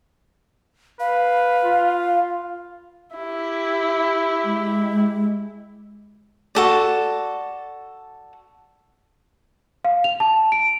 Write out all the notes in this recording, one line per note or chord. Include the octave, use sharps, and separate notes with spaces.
B4 F5
F4
E4 G4
G#3
F#4 A4 D5
F5
F7
A5
D7